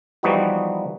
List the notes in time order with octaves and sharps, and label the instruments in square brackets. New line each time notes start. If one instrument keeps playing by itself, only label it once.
[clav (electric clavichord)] E3 F3 G3 B3 D#4 F#4